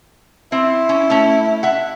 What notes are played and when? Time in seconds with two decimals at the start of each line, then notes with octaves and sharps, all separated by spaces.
0.52 C4 E4
0.89 C#4
1.10 A3 C#4
1.63 E5 F#5